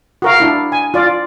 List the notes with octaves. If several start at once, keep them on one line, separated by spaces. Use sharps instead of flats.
F#4 A#4 F5
D4 E4
G#5
F4 D5